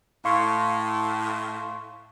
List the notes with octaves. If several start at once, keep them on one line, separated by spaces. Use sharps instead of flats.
A2 F5 C6 C#6